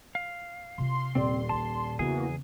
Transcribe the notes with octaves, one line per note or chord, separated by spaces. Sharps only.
F5
C3 F4 C6
D#1 C4 D5
A#1 A5
E2 C#3 E3 A#3 B3 F#4 G#4